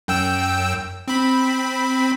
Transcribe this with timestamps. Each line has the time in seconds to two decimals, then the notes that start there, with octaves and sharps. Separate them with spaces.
0.08 F#2 G5 E6
1.08 C4 B5